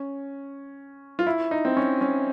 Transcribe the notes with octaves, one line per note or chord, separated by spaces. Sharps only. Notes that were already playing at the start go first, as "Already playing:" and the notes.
Already playing: C#4
F4
E4
D#4
C4
C#4
C#4